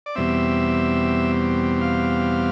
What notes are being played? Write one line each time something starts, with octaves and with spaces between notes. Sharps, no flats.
D5
E2 B2 G3 C4 E5
F5